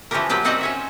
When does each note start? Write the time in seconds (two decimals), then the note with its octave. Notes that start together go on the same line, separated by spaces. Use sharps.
0.11 E3 F3 C#4 F4 G4 A#4
0.29 A#2 F#3 F4 G4 F5
0.44 C4 D#4 F#4 D5 D#5 A#5
0.61 C#4 C#5 E5